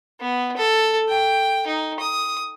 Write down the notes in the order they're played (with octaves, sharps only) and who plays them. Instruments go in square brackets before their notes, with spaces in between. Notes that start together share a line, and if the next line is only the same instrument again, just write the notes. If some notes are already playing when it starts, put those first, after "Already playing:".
[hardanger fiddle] B3
A4
G5
D#4
D#6